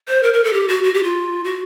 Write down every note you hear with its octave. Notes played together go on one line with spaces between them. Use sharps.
C5
A#4
A#4
A4
G4
F#4
F#4
G4
F4
F#4